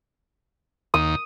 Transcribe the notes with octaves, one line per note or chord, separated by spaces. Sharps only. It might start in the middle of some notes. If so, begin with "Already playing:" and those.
D#2 D#6